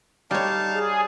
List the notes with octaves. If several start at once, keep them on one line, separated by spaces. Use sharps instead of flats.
G3 D#4 C#5 F5 A5
G#4